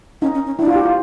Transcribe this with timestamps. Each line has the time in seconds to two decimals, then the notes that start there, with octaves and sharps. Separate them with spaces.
0.22 C#4 D#4
0.35 C#4
0.46 C#4
0.59 D4 E4
0.67 F4
0.76 G4
0.85 F4